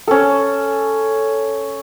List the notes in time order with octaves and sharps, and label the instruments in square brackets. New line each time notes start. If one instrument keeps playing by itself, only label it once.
[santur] C#4 A4